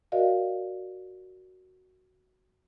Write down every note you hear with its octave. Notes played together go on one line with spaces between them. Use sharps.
F#4 A#4 D5 D#5 F5